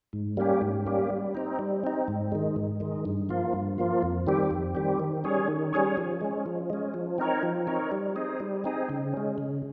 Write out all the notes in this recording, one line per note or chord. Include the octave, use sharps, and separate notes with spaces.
G#2
G3 A#3 C#4 G4
G#2
G3 A#3 C#4 G4
G3
C4 D#4
G3
C4 D#4
G#2
D#3 G#3
G#2
D#3 G#3
G2
F3 A#3 F4
G2
F3 A#3 F4
F2
D#3 G3 C4 G4
F2
D#3 G3 C4 G4
D#3
G3 C#4 G#4 C#5
D#3
G3 C#4 G#4 C#5
F3
G#3 C#4
F3
G#3 C#4
F3
C4 D#4 A#4 C#5
F3
C4 D#4 A#4 C#5
G3
C4 D#4 G#4
G3
C4 D#4 G#4
C#3
G#3 C#4
C#3